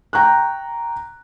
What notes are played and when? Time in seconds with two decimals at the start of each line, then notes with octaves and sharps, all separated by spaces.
0.13 G5 A#5 C#6 F#6